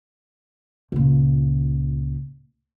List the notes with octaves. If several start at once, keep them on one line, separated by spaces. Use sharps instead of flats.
C#2 A#2